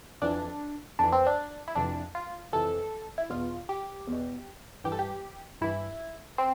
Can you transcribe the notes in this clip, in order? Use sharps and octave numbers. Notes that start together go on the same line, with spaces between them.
F2 E3 D4
F2 E3 D4
C4
D4
E4
F2 C3 E3 D4
F4
F2 C3 E3 A4
E4
E2 B2 F4
G4
E2 B2
G2 E3 G4
A4
G4
G2 E3 E4
C4